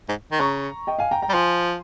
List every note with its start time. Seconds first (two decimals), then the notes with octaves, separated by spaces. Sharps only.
0.09 G#2
0.32 D#3
0.40 C#3 A#5 C#6
0.87 D#5 G5
0.99 F5 G#5
1.11 G5 A#5
1.22 G5 A#5
1.29 G3
1.33 F3 G#5 C6